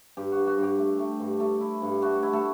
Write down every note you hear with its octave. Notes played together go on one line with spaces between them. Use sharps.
G2 G4
G2 F#4
F#4
G2
G4
A3
A3
G2
A3
E4
G2
A3 F#4
E4
A3 A4